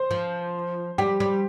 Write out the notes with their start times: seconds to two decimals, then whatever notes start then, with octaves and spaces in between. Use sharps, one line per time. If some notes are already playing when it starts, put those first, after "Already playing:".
Already playing: C5
0.11 F3
0.98 G3 G4
1.20 G3